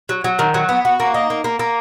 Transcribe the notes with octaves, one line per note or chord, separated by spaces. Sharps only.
F#3
F#3
D#3
F#3
B3
F#4
A#3
D#4
A#3
A#3
A#3